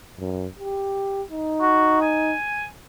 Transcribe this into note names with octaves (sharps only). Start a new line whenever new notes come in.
F#2
G4
D#4
F#4
G#5